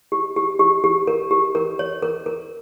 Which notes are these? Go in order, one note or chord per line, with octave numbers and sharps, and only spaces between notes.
G4
G4
G4
G4
A#4
G4
A#4
C#5
A#4
A#4